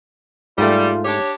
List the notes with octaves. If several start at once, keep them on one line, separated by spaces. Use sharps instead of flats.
G#2 G3 A3 F4
D4 G4 C#5